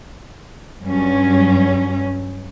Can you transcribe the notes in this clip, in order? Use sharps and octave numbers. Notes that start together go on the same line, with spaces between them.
G2 F#3 C#4